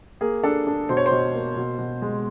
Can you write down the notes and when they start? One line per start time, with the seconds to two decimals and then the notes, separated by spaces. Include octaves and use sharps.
0.21 A#3 G#4
0.43 D4 A4
0.67 D4
0.89 B2 C5
0.97 C#5
1.06 C5
1.11 B2
1.34 A#3
1.57 B2
1.79 B2
2.02 G#3